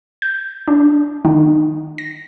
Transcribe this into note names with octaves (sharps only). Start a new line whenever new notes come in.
G6
D4
D#3
A#6